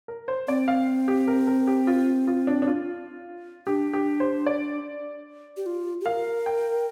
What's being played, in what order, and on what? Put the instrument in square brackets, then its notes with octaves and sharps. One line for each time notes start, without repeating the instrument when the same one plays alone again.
[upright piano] A#4
C5
[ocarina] C4 [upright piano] D5
[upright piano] F5
G4
A#4
A#4
G4
F4
F4
D4
D4
F4
[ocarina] D4 [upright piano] G4
[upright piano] G4
C5
D5
[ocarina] G4
F4
G4
[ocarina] A#4 [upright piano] F5
[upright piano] G5